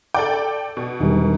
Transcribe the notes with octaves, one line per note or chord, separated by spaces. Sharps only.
A4 D5 G5 D6
B2
E1 D#3 G3